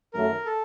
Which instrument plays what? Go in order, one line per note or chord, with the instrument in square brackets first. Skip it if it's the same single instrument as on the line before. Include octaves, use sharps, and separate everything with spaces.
[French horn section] F#2 D#3 F#3 A3 [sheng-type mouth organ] A#4
[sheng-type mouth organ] A4